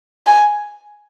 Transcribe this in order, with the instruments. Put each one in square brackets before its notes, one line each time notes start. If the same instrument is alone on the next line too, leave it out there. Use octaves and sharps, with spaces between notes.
[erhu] G#5